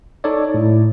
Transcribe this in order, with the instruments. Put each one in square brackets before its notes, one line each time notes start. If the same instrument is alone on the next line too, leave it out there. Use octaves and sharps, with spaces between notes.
[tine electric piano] D#4 A4 C#5 D5
A2